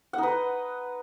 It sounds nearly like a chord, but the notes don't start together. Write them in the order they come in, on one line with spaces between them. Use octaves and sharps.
F#5 D#4 B4 D#5